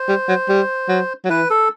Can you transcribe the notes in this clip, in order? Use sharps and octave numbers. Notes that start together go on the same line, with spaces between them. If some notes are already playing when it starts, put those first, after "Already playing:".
Already playing: C5
G3
F#3
G3
F#3
F#3
E3 B4
A4